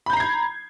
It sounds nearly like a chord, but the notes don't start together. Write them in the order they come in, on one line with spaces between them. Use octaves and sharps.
B5 G6 A#5 C7 G#6